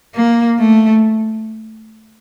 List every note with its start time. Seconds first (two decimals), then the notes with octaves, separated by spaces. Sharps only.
0.15 A#3
0.58 A3